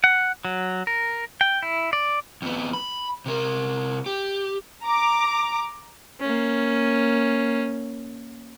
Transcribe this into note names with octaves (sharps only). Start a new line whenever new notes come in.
F#5
F#3
A#4
G5
E4
D5
F2 B3
B5
C3 A#4
G4
A#5 D6
A#3 C#4